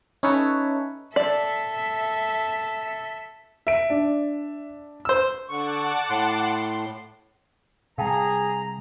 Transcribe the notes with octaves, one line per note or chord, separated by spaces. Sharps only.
C#4 D#4 A4 B4 C#5 E5
A4 D5 E5
E5 D7
D4
C5 E6
D3 F#5 A5 C#6 D6
A2 C6
C3 G3 G#4 F5 G5 A5 A#5